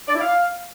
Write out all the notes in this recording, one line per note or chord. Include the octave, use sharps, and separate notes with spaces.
D5
E4
F5